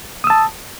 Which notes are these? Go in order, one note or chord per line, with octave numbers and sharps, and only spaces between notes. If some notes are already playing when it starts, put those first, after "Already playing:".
A5 D#6 E6